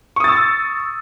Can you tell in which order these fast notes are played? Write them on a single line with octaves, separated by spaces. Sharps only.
C#6 D#6 A6 E6